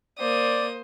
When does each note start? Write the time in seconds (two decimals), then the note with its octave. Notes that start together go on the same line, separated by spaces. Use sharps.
0.19 A#3 C5 D5 D#6